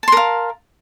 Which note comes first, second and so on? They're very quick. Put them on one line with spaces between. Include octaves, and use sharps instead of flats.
A5 C6 A#4 F5